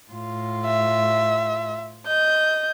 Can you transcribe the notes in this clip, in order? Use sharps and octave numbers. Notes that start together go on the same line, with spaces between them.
A2 F4
E5
D#5 G6